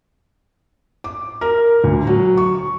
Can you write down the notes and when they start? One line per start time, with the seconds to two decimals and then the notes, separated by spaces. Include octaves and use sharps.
1.04 D6
1.41 A#4
1.84 D2
2.07 F#3
2.37 C#6